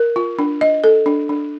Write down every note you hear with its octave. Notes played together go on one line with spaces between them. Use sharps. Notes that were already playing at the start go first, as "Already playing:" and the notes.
Already playing: A#4
F4
D4
D#5
A4
D4
D4